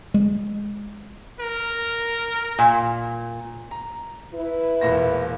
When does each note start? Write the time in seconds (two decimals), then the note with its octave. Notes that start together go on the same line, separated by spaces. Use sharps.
0.14 G#3
1.40 A#4
2.59 A#2
3.71 A#5
4.34 E4 B4
4.81 E1 A#2 A#6